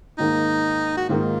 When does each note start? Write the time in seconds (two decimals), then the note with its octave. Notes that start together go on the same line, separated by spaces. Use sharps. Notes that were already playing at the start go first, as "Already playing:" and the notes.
0.18 G#2 D#3 A#3 D#4
0.97 F#4
1.09 G#2 D#3 A#3 F4